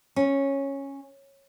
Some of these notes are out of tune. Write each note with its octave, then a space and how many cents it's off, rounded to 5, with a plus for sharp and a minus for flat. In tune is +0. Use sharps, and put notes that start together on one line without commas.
C#4 -10